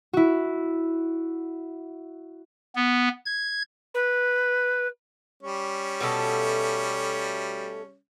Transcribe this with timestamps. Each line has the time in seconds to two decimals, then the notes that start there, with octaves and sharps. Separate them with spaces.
0.13 E4 F#4
2.76 B3
3.26 G#6
3.94 B4
5.43 G3 C#4
6.01 B2 A3 A4